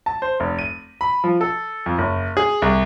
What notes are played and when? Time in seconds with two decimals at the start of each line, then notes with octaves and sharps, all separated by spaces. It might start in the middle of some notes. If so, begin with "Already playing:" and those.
0.06 A5
0.22 C5
0.40 F1
0.59 D#7
1.01 B5
1.24 F3
1.41 A4
1.86 F2
1.98 F#1
2.37 G#4
2.62 C2